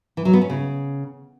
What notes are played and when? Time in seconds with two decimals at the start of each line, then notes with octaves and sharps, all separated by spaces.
0.17 E3
0.25 F#3
0.33 B3
0.42 C#4
0.50 C#3